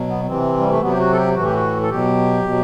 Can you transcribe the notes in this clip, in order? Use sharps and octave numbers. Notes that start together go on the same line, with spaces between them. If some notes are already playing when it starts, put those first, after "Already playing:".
Already playing: B2 F#3
B3
C3 E3 C4
G3
A3
C3 F#3 B3
G4
F#4
A4
G4
A2 E3 F#4
G4
F#4
A4
B2 F#3 G4
B2 F#3